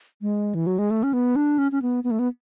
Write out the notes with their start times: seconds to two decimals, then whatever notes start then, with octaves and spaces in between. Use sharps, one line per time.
0.22 G#3
0.55 E3
0.67 F#3
0.79 G#3
0.90 A3
1.03 C#4
1.13 B3
1.36 D4
1.58 C#4
1.72 C#4
1.82 B3
2.04 B3
2.11 A3
2.19 B3